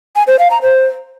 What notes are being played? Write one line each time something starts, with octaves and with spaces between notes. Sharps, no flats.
G#5
C5
F5
A#5
C5